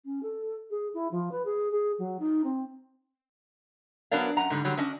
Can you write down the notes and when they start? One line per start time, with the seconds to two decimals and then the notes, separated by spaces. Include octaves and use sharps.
0.05 C#4
0.23 A4
0.70 G#4
0.94 E4
1.11 F3
1.31 B4
1.45 G#4
1.71 G#4
1.98 F#3
2.19 D#4
2.44 C4
4.11 F#3 B3 D4 A#4 D5 F5
4.37 F#2 F#5 A#5
4.50 G#2 D3 E3 G3
4.65 D3 F#3 G3
4.77 C#4 D4 D#5